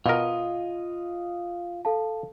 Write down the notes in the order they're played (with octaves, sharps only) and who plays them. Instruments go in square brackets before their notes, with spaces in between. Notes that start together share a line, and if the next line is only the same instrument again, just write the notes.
[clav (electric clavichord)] B2 A#4 [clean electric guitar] F4 D#5
[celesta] A4 F5 A5